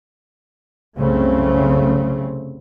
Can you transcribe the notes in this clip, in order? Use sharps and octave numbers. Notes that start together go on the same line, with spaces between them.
C2 F#2 C#3 A3 C4